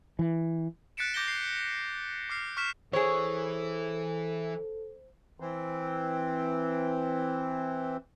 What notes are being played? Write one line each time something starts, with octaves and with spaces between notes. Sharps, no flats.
E3
F#6 A6 B6 C#7 D7 E7
D6 G6 A#6 G7
C7
D6 F6 C7
C#6 F6 B6 E7
E3 G#4 A4 C5 C#5
E3 C4